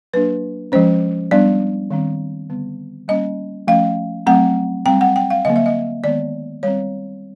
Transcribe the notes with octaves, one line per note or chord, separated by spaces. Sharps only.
F#3 A#3 D4 B4
F3 G#3 C#4 C5
G3 B3 D4 D5
D#3 G3 C4
D3 G3 B3
G3 A#3 C#4 D#5
F3 A3 C#4 F5
F#3 A3 C4 F#5
G3 C4 G5
F#5
G5
F5
D3 F#3 A#3 D#5
E5
D#5
D#3 G#3 B3 D5
G3 C4 C#5